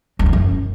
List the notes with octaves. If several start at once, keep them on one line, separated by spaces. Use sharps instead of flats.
F#3
F3
F#2